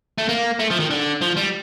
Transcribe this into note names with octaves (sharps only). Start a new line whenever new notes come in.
A3
A#3
A3
F3
D#3
D3
F3
G3